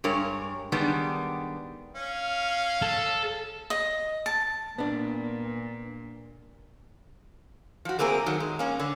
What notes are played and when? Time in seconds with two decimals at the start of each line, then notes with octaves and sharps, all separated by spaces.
0.04 G2 G#3 A#4 C#5
0.72 D#3 G3 G#3 B3 D4
1.96 C#4 F5
2.82 A4
3.70 D#5
4.26 A5
4.78 A#2 B3 D4
7.85 F3 F#4
7.99 A3 A#3 C4 G#4 A#4
8.26 D#3 F#3
8.40 G#3
8.59 A#3 C#4
8.80 D3